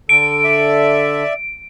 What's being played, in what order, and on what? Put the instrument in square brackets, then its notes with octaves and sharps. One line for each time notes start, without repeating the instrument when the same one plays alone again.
[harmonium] D3 A4 [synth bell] D7
[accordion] D5 E5